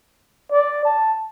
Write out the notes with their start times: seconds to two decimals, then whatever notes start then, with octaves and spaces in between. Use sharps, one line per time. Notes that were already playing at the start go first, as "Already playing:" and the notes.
0.52 D5
0.85 A5